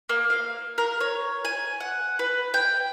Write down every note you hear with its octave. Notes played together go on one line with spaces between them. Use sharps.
A#3
F5
A#4
C#5
G#5
F#5
B4
G5